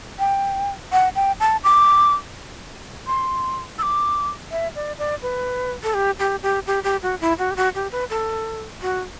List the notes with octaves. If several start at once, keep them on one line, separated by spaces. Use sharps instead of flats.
G5
F#5
G5
A5
D6
C6
E6
D6
E5
D5
D5
B4
A4
G4
G4
G4
G4
G4
F#4
E4
F#4
G4
F#4
G4
B4
A4
F#4